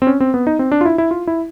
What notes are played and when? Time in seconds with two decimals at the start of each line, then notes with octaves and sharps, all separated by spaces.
0.02 C4
0.07 C#4
0.20 C4
0.34 B3
0.47 D#4
0.59 C4
0.72 D4
0.81 F4
0.85 E4
0.98 E4
1.11 F4
1.27 E4